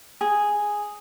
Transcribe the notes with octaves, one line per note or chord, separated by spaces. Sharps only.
G#4